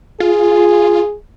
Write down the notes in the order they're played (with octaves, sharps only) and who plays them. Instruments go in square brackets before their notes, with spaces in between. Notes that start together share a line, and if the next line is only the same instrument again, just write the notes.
[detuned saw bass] F4 [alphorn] G#4